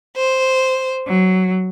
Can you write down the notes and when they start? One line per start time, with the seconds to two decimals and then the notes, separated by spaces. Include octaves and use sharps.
0.17 C5
1.07 F#3